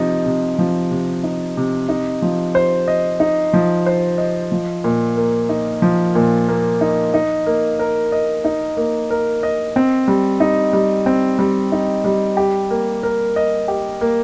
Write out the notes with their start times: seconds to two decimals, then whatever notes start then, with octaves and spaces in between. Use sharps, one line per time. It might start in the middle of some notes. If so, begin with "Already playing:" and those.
Already playing: C3 F3 D#4
0.26 C3
0.59 F3
0.91 C3
1.24 D#4
1.57 C3
1.89 D#4
2.22 F3
2.55 C5
2.88 D#5
3.20 D#4
3.53 F3
3.86 C5
4.18 D#5
4.52 F3
4.84 A#2
5.17 A#3
5.49 D#4
5.82 F3
6.15 A#2
6.48 A#3
6.81 D#4
7.14 D#4
7.46 A#3
7.79 A#4
8.12 D#5
8.45 D#4
8.77 A#3
9.11 A#4
9.43 D#5
9.76 C4
10.08 G3
10.40 D#4
10.73 G3
11.06 C4
11.39 G3
11.72 D#4
12.04 G3
12.37 G4
12.71 A#3
13.03 A#4
13.36 D#5
13.68 G4
14.01 A#3